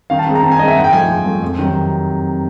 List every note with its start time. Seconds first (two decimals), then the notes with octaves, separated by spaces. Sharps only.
0.10 D#3 F5
0.19 A5
0.27 G#3 C4 D#4
0.36 A#5
0.43 D#3 A5
0.51 G#5
0.59 G#3 C4 D#4 D#5
0.68 E5
0.76 G#2 F#5
0.84 G5
0.93 F3 A3 G#5
1.08 G#2
1.25 F3 A3
1.42 F2
1.59 C3 D#3 F#3